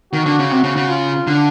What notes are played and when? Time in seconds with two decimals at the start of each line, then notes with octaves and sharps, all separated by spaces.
0.13 D#3 F#4
0.26 D3
0.39 C#3
0.51 C3
0.64 C#3
0.76 C#3
0.89 F4
1.27 D3